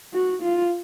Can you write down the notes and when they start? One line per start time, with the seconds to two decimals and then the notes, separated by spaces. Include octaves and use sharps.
0.13 F#4
0.42 F4